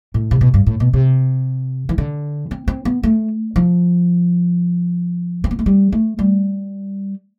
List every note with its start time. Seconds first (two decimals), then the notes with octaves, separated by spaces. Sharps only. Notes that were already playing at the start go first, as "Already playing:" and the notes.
0.14 A2
0.31 C3
0.41 B2
0.54 G2
0.67 A2
0.80 B2
0.93 C3
1.89 E3
1.98 D3
2.51 C4
2.68 C4
2.85 B3
3.03 A3
3.56 F3
5.44 C4
5.51 B3
5.59 A3
5.66 G3
5.92 A3
6.19 G3